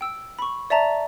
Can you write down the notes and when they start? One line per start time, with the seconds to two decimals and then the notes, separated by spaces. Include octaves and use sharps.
0.01 G5 E6
0.39 B5 C#6
0.70 D5 E5 A5 A#5